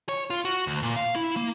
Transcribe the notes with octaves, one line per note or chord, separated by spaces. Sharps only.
C#5
F4
F#4
D2
A#2
F5
E4
A#3